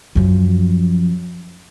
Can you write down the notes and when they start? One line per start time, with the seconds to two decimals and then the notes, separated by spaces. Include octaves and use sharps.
0.15 F#2 F3